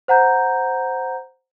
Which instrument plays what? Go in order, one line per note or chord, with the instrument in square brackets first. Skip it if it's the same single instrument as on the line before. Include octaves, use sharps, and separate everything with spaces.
[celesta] C5 F#5 A#5 G6